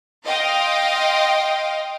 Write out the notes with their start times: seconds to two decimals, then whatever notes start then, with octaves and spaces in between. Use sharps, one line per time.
0.24 D#5 F5 G5 C6